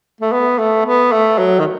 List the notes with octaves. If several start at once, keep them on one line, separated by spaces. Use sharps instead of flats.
A3
B3
A3
B3
A3
F#3
D#3